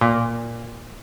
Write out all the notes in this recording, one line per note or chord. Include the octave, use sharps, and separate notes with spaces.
A#2